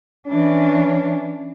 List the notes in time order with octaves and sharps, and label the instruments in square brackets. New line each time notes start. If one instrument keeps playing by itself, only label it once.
[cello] E3 D4 [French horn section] C#4